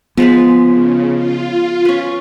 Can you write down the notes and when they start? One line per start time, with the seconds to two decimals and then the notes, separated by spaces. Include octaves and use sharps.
0.17 F3 G#3 B3 B4
0.58 C#3
1.13 F4
1.85 C#4 B4